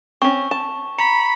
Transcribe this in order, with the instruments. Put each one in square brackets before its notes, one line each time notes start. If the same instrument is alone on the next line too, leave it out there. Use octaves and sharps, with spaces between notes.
[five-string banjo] C4 C#4 [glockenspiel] C#6
[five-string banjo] A5
[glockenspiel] A#5 C#7 [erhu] B5